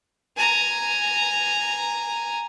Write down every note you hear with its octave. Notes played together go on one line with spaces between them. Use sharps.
G#5 A#5